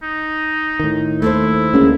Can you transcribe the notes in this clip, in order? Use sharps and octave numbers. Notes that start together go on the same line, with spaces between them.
D#4
A2 D#3
D#2 A3 E4 A4 C5
D2 C#3 G#3 A#3